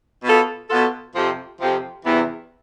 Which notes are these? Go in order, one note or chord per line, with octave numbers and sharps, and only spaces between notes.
B2 B3 F4 A4
B2 B3 F4 A4
F2 C3 F3 C4 G4
F2 C3 F3 C4 G4
E2 C3 E3 B3 E4